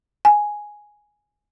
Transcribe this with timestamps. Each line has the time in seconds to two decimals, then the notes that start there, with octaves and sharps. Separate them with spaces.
0.25 G#5